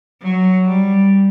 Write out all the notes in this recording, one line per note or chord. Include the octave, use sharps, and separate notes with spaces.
F#3
G3